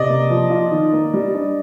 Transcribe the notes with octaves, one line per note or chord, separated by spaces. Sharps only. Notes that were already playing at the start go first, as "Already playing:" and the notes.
Already playing: C3 D5 D#5
A#3
F3
F4
D#3
A#3
G3
D4